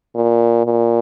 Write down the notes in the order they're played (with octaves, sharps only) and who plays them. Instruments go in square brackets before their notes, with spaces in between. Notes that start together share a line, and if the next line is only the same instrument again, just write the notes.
[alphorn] A#2
A#2